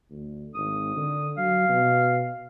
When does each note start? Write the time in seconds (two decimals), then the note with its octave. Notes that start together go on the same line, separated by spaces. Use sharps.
0.10 D2
0.55 G#1 D#6
0.96 D3
1.37 F#3 F5
1.69 B2